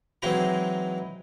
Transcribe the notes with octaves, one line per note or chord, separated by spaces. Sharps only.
E3 F#3 G#3 C4 D#4 E4